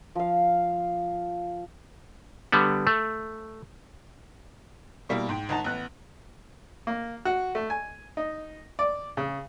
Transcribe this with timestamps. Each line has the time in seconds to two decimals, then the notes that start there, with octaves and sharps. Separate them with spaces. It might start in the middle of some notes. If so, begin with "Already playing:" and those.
0.15 F3 F5
2.52 D3 G3 B3
2.87 A3
5.09 B2 G3 A#3 E4
5.29 G#2 G5
5.49 G1 D#4 F#5 A5 F7
5.64 A1 B3 F#6
6.87 A#3
7.25 F#4
7.55 A3
7.70 G#5
8.17 D#4
8.79 D5
9.17 C#3